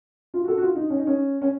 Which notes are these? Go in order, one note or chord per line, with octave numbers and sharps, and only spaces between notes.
F4
F#4
A4
F#4
F4
D#4
C#4
D#4
C#4
C#4